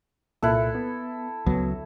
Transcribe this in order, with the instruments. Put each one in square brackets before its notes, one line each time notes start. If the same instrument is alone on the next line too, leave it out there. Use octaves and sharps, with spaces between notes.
[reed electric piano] C2 A#2 F#6 [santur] E4 A4
[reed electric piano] B3
[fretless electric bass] C#2 F#3 [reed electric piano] B3